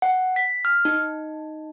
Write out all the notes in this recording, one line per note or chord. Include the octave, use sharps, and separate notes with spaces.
F#5
B6
F6
D#4